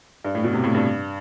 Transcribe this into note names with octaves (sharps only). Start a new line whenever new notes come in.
G2
A2
B2
C3
A2
G2